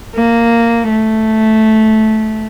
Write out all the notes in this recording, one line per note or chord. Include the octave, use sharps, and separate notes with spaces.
A#3
A3